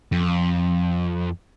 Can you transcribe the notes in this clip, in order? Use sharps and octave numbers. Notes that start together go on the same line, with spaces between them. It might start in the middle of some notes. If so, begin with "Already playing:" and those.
F2